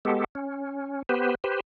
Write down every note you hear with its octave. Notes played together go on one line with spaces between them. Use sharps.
G#3 B3 G4 A4
C#4
B3 G4 B4 C5
G4 B4 C5